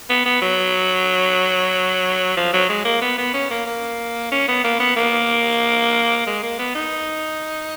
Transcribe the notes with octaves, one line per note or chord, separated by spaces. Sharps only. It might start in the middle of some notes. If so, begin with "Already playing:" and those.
B3
B3
F#3
F3
F#3
G#3
A#3
B3
B3
C#4
A#3
A#3
C#4
B3
A#3
B3
A#3
G#3
A#3
B3
D#4